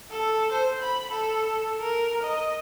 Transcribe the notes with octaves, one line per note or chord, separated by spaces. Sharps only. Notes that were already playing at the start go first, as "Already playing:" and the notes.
A4
C5
B5
A4
A#4
D#5